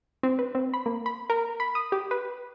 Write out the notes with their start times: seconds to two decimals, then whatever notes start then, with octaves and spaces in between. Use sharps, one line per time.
0.23 C4
0.39 B4
0.55 C4
0.74 B5
0.86 A#3
1.06 B5
1.30 A#4
1.60 B5
1.75 D#6
1.92 G4
2.11 B4